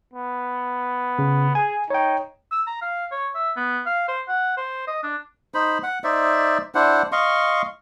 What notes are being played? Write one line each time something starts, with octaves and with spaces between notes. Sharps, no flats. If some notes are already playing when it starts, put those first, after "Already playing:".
B3
C#3
G#4 G#5
D#4 C#5 G5
E6
A#5
F5
C#5
E5
B3
F5
C5
F#5
C5
D#5
D4
D#4 C5 B5
F#5
D#4 C5 D5 E5
D4 E4 C5 F#5
D#5 F5 C6 C#6